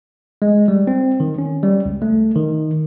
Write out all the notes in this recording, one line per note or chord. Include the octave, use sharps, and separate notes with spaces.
G#3
G3
C4
D#3
C#4
G3
C#2
A3
D#3